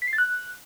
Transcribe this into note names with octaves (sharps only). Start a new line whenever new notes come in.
B6
C7
A6
F#6